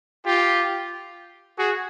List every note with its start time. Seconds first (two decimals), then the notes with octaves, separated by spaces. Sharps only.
0.25 F4 G4
1.58 F#4 G#4